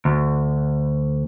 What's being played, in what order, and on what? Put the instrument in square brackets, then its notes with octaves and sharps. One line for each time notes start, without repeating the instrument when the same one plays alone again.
[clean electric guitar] D2